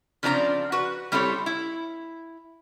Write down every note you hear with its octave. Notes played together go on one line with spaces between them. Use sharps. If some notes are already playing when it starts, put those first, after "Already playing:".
C#3 F3 C4 D4 G4 A#5
F#4 B4
G3 C4 E4 G4 A4 C#5
E4